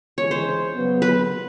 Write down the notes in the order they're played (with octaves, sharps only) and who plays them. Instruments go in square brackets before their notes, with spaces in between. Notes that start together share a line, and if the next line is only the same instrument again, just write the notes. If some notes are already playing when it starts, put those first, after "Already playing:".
[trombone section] E3 G#3 C#4 [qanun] C#5
[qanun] C5
[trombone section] C#3 F#3 B3
[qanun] B4